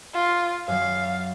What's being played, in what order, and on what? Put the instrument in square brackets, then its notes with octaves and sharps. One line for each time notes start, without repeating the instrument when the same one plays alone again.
[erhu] F4
[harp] F#2 F#3 [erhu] F5